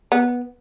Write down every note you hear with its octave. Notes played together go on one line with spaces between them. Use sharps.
B3